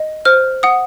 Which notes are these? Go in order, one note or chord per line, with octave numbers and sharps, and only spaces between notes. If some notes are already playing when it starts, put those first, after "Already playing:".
Already playing: D#5
C5 F6
F#5 D#6